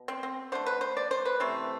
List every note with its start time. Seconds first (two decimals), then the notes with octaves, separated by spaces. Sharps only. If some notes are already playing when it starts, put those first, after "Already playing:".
Already playing: B2
0.08 C4
0.23 C4
0.52 D3 A3 C5
0.66 B4
0.81 C5
0.97 D5
1.11 C5
1.25 B4
1.40 C3 E3 A3 C5